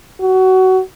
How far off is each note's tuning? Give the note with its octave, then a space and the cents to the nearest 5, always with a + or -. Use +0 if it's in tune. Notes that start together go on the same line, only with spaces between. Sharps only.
F#4 +20